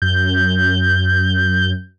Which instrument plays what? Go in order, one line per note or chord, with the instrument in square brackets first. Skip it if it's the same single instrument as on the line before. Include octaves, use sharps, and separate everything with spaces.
[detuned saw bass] F#2 [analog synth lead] G6